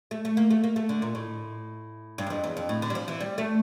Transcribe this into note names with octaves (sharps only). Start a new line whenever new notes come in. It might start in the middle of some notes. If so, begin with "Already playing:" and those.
A3
A3
A#3
A3
A#3
A3
D3
A#2
A2
G2
E2
F2
E2
F2
A2
D3
G3
F3
E3
G3
A3